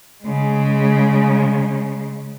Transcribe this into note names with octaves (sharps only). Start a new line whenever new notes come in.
C#3 G#3